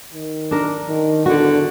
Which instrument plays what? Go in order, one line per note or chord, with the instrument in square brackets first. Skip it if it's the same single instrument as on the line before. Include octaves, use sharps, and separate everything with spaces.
[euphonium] D#3
[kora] D4 A#4
[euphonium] D#3
[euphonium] E2 [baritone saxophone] D3 [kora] F#4